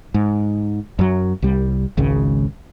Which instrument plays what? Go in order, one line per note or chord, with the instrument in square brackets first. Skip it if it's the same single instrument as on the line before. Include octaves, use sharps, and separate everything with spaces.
[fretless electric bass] G#2
F#2 F#3
C2 G3
G#1 C#2 C#3